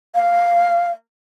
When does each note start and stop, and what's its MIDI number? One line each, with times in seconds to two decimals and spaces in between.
0.15 0.90 77